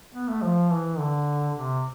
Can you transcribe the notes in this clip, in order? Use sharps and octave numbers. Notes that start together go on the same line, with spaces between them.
B3
A3
F3
E3
D3
C3